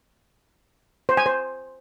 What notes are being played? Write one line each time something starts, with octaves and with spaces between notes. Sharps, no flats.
C5
G#5
C5